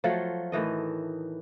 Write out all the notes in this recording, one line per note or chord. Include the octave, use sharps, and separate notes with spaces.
F3 F#3 A3 F4
A2 D#3 E3 D#5